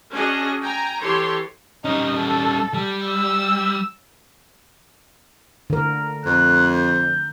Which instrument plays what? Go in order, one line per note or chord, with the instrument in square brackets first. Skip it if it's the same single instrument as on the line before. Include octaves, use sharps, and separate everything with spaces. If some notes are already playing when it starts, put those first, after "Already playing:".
[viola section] C#4 D4 F#4 G#4 D#5
G5 G#5 A#5
E3 G4 A4 C#5 C6
[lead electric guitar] G3 C#4 [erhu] D#4
[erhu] A4
[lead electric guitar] G3
[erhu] E6
[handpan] D3 A#4
[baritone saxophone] F2 [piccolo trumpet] F#6
[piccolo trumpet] G6